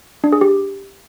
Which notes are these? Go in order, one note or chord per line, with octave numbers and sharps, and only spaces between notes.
D4
G#4
G4